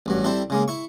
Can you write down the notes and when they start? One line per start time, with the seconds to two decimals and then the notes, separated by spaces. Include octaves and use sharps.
0.06 A1 G2 F#3
0.24 G3 C4 E4 A4
0.50 C#3 G#3 A#3
0.68 E4 C#6